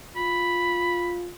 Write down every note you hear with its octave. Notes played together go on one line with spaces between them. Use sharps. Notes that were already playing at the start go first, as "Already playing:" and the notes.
F4 B5